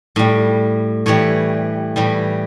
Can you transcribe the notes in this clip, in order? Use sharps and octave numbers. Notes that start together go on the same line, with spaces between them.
A2 G3
A2 E3 G3 C#5
A2 E3 G3